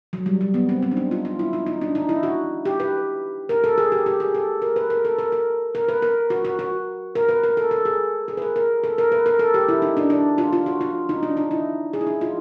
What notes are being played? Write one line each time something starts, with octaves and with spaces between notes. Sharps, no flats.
F#3
G3
G3
B3
C4
C4
D4
D#4
F4
F4
E4
D#4
D#4
D4
D#4
E4
F#4
G4
B4
A#4
A4
G#4
G4
G4
G#4
A4
A#4
B4
A#4
A4
A#4
A#4
A#4
B4
A#4
F#4
F#4
F#4
A#4
B4
A#4
A4
A4
G#4
G#4
B4
A#4
A#4
A4
A#4
B4
A#4
A4
G4
E4
D#4
D4
D4
F4
F4
F#4
F4
D#4
D4
D#4
E4
G#4
E4
D#4
F4